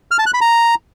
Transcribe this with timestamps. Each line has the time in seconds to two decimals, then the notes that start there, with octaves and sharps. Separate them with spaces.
0.11 F6
0.19 A5
0.26 F#6
0.34 B5
0.41 A#5